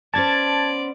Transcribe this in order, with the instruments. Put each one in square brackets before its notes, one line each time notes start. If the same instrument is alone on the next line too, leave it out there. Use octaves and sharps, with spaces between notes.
[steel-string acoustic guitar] B3 C#4 C5 [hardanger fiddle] D5 [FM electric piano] A5 G#6 A6